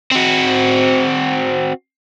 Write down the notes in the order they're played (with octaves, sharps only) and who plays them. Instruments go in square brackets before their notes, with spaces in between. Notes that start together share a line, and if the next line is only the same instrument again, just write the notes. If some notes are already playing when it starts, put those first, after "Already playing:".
[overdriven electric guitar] C4 F#4